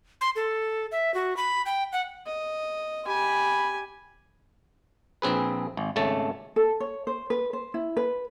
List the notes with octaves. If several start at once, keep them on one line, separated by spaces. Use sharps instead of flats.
C6
A4
E5
F#4
B5
G5
F#5
D#5
G4 G#5 B5
A#1 C4 G#4 B4
G#1
G#1 C#3 A3 A5
A4
C#5
C5
B4
C5
E4
B4